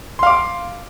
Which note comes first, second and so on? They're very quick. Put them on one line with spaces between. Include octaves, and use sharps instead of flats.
C6 F5 D6